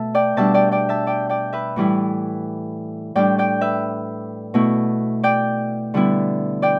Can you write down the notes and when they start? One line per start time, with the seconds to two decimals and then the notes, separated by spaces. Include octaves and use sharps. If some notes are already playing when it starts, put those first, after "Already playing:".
Already playing: B2 A3 E5 A5
0.15 D5 G5
0.37 B2 G3 D4 E5 A5
0.54 D5 G5
0.72 D5 G5
0.89 E5 A5
1.07 D5 G5
1.29 D5 G5
1.53 B4 E5
1.76 A2 E3 G3 E4
3.15 A2 G3 D4 D5 G5
3.38 D5 G5
3.61 B4 E5
4.54 B2 A3 E4
5.23 D5 G5
5.94 D3 G3 B3 E4
6.62 D5 G5